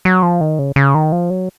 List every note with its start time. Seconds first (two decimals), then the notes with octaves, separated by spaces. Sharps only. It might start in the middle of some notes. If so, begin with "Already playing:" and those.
0.05 F#3
0.23 F3
0.41 D#3
0.59 C#3
0.76 C#3
0.95 D#3
1.12 F3
1.30 F#3